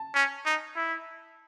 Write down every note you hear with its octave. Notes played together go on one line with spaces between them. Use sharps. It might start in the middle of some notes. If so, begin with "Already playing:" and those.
Already playing: A5
C#4
D#4
E4